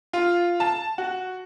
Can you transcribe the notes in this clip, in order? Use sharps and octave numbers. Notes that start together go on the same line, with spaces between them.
F4
A5
F#4